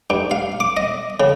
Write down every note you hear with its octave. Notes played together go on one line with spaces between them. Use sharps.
G2
F5
D6
D#5
C#3